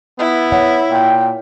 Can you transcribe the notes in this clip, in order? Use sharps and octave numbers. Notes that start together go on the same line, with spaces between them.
B3 E4
C#5 F#5
A#2 G5